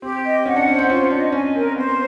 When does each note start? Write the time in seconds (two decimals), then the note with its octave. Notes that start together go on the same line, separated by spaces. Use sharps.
0.02 C4 G4
0.24 D#5
0.46 C#4 F#5
0.56 D4
0.68 C#4 C5
0.79 C4
0.89 C#4 F4
1.11 D4 D#5
1.32 C#4 G#5
1.55 C4 A#4
1.76 B3 C5